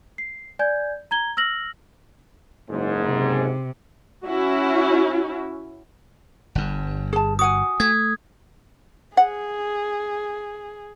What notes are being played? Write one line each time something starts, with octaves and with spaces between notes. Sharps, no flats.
C7
D5 G#5 G6 G#6
A#5 G#6 G7
E6 F6 A#6 F#7
F#1 G#2
C3
C#4 E4 F#4
G1 G2
G#4 A5
F#4 F#5 G#5 D#6
A3 G#6
G#4 F#5